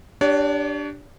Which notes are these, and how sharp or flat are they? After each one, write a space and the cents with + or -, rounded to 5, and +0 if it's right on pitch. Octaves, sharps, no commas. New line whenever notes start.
D4 +0 G4 +0 C#5 +40